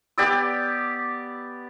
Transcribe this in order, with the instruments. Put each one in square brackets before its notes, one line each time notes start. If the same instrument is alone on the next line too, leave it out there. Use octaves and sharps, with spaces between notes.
[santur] B3 G4 D5 E6